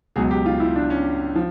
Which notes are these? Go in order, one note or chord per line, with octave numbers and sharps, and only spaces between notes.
C#2 B2 F#3 G#4
G4
F4
E4
D4
C#4
F3